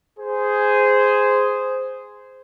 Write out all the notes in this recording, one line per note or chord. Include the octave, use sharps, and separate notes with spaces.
G#4 C5